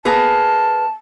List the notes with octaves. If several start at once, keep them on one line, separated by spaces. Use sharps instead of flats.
A#3 G#4 B4 A5